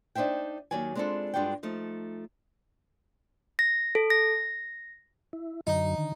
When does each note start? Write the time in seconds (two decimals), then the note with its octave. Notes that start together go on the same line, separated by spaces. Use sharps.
0.15 D4 D#4 C5 E5 G5
0.71 D#2 D#3 F#3 D5 G#5
0.95 G#3 C4 D4 E4 F4 A4
1.34 G2 G#3 D4 F4 F#4 G5
1.63 F3 A3 D#4
3.59 A#6
3.95 A4
4.10 A#6
5.33 E4
5.67 F#2 D3 F#3 D#4
5.98 D3 D#3